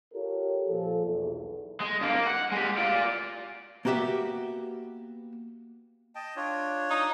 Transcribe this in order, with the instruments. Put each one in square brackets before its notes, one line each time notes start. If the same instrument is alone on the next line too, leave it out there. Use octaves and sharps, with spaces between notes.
[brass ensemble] F4 G4 A4 A#4 C#5
A#2 F3 A4
B1 E2
[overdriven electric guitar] G#3
G2 A#3
A#3
F#5
G#3 G4
F4 D5
[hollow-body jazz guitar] A#3 B3 F#4 G4 E5
[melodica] D#5 G5 A5
D4 F4 C#5
[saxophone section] D#4